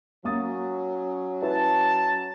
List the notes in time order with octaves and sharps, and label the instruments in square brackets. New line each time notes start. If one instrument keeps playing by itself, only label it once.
[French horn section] F#3 C#4 [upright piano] A#3 D#6 A6
[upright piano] E4 B4 C#5 [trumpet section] A5